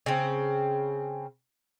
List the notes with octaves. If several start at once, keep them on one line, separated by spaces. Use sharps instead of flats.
C#3 C4